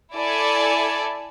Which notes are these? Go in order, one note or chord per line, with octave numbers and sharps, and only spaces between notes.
E4 A4 D5 G#5